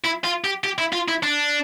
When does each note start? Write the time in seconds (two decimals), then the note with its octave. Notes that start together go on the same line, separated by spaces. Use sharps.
0.05 E4
0.24 F4
0.44 G4
0.64 G4
0.79 E4
0.93 F4
1.08 E4
1.23 D4